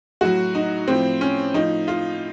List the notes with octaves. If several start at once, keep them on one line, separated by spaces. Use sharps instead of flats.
A2 F#3 F#4
D#4
A2 F3 C4
C#4
A2 F3 D#4
F4